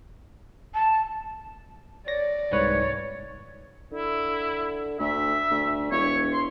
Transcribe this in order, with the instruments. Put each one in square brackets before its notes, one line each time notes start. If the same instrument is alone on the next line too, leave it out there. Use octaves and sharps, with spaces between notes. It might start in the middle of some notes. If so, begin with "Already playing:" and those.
[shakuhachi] A5
[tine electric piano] C#5 A#6 [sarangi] D5
[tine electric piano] C2 G#2 B4 [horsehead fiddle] C#5
[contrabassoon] D3 [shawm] E4
[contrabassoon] D2 [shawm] E5
[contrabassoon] D2
[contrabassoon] E1 [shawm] C#5
[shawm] C6